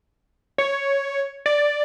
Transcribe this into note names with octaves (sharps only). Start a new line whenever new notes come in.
C#5
D5